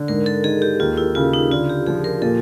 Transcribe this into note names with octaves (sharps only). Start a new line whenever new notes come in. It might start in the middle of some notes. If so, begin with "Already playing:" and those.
Already playing: D3
G#2 A#4
A4
D#3 G#4
G4
D#2 F4
E4
C#3 F4
D#4
D3 F4
G4
F3 G#4
A#4
A#2 A4